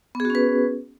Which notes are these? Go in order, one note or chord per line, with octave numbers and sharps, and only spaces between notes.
B3 C#4 F#4 G#4 B4